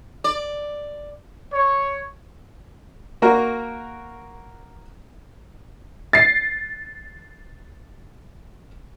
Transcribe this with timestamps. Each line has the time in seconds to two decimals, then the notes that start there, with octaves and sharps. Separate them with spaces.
0.24 D5
1.52 C#5
3.22 A#3 F#4 A#4
6.13 A6 C7